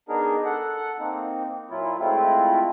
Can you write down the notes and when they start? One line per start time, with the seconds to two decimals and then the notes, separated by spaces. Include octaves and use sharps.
0.09 B3 D4 D#4 G#4 A#4
0.45 A4 F#5
0.99 A#3 C4 D#4
1.70 A#2 F#3 E4 F4
1.99 G#3 A3 C4 E4 F4